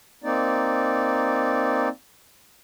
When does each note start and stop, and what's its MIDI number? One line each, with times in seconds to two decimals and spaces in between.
0.24 1.89 58
0.24 1.89 60
0.24 1.89 63
0.24 1.89 74